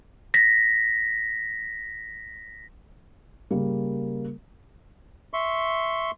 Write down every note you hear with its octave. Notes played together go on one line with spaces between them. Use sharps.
A#6 B6
C#3 G3 A#3
E5 C6 C#6